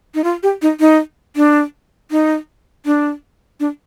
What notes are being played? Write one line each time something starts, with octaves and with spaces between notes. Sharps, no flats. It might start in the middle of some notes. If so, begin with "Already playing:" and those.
D#4
F4
G4
D#4
D#4
D4
D#4
D4
D4